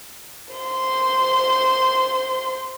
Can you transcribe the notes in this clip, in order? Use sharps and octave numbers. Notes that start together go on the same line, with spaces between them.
C5 C6